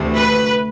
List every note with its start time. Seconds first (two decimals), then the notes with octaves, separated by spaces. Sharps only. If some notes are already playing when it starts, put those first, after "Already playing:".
Already playing: D2 C3 E3 A3
0.15 B4